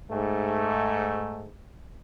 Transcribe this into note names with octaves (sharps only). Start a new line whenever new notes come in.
G#2 A3